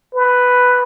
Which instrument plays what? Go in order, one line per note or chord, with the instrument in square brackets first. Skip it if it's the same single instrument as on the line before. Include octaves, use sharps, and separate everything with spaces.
[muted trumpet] B4